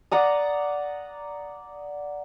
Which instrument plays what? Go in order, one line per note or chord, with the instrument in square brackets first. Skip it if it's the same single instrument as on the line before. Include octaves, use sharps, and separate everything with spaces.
[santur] D5 F#5 A#5 D#6